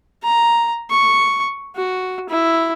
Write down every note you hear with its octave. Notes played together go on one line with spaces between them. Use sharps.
A#5
C#6
F#4
E4